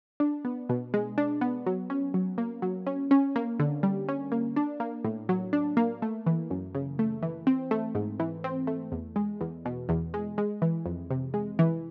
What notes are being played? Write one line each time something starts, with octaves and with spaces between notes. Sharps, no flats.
D4
B3
B2
G#3
D4
B3
F#3
C#4
F#3
A#3
F#3
C#4
C#4
A#3
D3
G3
C#4
A#3
D4
A#3
A2
F#3
D4
A#3
A3
E3
F#2
C#3
A3
E3
C4
A3
G#2
E3
C4
A3
E2
G#3
E2
B2
E2
G#3
G#3
E3
F2
C3
G#3
E3